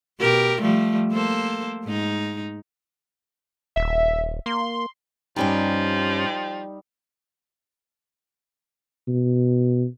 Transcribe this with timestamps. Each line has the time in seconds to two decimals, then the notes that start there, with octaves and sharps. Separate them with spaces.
0.20 B2 G4 A#4
0.61 F3 G3 A3
1.11 A#3 A4 C5
1.84 G#2 D#4
3.76 D#1 E5
4.46 A#3 C6
5.36 G2 F3 G3 C#4 D#4 G4
9.08 B2